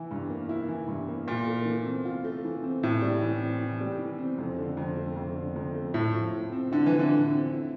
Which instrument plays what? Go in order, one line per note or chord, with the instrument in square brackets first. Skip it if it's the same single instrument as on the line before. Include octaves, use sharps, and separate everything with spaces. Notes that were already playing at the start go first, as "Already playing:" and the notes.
Already playing: [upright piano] E3 E4
G2
A#3
E4
E3
G2
A#3
[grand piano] A#2 [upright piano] F4
[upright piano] A3
E3
C4
F4
A3
E3
C4
[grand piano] A2 [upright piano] E3
[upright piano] G3
E3
C4
E3
G3
E3
C4
F2
D3
F2
A3
F2
D3
F2
A3
[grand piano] A2 [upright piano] E4
[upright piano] F3
A2
C4
[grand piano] D3 [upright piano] E4
[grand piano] E3
[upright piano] F3
[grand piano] D3
[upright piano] A2
C4
E4